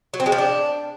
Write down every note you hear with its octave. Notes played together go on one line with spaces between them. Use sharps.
F#3
C4
G#3
F3
D4